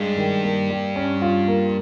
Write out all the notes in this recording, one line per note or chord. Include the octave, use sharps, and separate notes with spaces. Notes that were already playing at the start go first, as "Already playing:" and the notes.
Already playing: G2 G#3
D#3
A#3
G3
C#4
F4
A#3